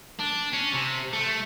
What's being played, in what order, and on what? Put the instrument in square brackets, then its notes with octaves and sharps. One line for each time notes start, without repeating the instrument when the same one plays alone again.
[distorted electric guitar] D4
C#4
C3
A3